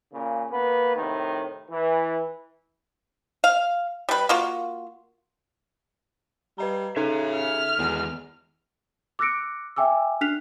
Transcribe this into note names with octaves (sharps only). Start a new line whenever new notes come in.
A#2 C#3
A#3 B3 B4
A2 C3 D#3
E3
F5
G3 B4
A#3 F4 F#4
G3 B4 D#5 A#5
C#3 D#4 A4 E5 A#5 G#6
F6
E2 D#3 G#3 F#4
D6 E6 F#6 A#6 C#7 D7
E5 G5 G#5 D6 E6
D4 F6 F#6 B6 C7 F7